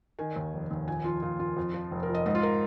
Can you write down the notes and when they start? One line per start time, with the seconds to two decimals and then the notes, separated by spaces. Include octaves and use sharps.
0.19 D#3 G#5
0.36 D#2
0.53 F1
0.71 D#2
0.88 A#2 G#5
1.04 F3 F4
1.22 A#2 F4
1.39 A#2 F4
1.57 F2
1.74 F3
1.91 F1
2.03 A#4
2.09 F3
2.15 D#5
2.26 G#2 D#5
2.35 F4
2.43 A#4